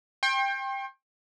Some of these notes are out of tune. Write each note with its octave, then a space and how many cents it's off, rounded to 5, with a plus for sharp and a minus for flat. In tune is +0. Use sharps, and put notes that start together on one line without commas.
G5 +15 C6 +45